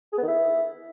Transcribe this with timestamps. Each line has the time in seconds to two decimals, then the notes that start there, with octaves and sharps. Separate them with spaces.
0.13 G#4
0.18 B3
0.23 D#3
0.28 E4